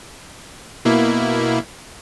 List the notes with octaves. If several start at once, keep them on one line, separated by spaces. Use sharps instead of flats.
B2 A#3 E4